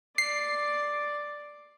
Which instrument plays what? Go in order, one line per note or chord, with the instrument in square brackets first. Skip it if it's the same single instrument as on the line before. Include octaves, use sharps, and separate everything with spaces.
[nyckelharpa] D5 [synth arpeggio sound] C7